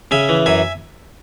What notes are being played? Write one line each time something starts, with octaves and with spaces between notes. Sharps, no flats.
C#3 E5 G#5
E3
F#2 E5 G#5